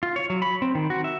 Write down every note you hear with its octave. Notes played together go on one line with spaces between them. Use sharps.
F4
C#5
F#3
B5
C4
D#3
F#4
E5